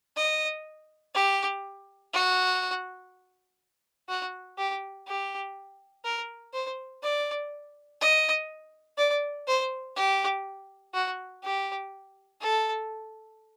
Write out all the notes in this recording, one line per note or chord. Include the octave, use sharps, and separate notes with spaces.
D#5
G4
F#4
F#4
G4
G4
A#4
C5
D5
D#5
D5
C5
G4
F#4
G4
A4